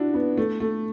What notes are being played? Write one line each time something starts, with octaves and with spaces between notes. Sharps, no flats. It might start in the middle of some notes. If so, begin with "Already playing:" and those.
Already playing: D4 E4 F#4
B3
A3
A3